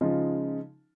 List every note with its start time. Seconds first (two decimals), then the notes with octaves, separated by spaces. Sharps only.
0.01 C#3 F3 G#3 D#4 F4